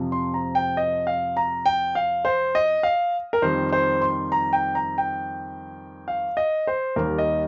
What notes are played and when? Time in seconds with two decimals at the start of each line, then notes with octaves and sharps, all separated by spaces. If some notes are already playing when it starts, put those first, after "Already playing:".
Already playing: F2 C3 F3
0.12 C6
0.34 A#5
0.55 G5
0.77 D#5
1.07 F5
1.37 A#5
1.66 G5
1.95 F5
2.25 C5
2.55 D#5
2.83 F5
3.33 A#4
3.42 F2 D#3 G3 C5
3.73 C5
4.02 C6
4.32 A#5
4.53 G5
4.75 A#5
4.98 G5
6.08 F5
6.37 D#5
6.67 C5
6.96 D#2 D#3 G3 A#4
7.18 D#5